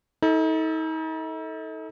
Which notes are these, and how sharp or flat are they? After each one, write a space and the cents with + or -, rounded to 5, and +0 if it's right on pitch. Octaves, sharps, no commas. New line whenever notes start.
D#4 +40 A4 +0